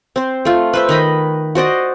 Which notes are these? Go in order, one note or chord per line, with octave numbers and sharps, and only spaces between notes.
C4 C5
A3 F4
B4 C5 E5
D#3 D#5 B5
F#4 C5 D5 D#5